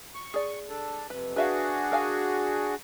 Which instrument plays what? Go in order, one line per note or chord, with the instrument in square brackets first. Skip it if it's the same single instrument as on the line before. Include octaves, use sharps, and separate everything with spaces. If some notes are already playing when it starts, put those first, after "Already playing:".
[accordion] C#6
[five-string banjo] G#4 D5
[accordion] D4 A4
[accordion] F2 C3 [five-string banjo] B4
[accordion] D4 F#4 G#4 [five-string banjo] B4 E5 F5
[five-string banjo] A#4 F5 G#5